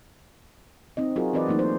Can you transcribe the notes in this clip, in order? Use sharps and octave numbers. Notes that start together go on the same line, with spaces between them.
C4 D#4 D#5
F#3 F4 F#4 G#4 A#4
E3 C4 F#4 B4 D5 D#5
E3 F#3 A3 A#3 D#4
C5